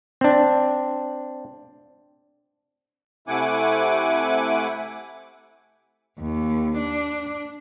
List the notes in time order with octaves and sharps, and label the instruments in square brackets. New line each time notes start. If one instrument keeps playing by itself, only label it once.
[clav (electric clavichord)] C4 D4
[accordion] C3 A3 E4 F#5 G#5 D6
[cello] D#2
D4